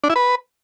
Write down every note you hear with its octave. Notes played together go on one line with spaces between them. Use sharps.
D4
E4
B4